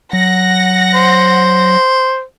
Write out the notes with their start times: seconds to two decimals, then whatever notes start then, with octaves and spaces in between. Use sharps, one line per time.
0.13 F#3 F#5 A#6
0.94 C5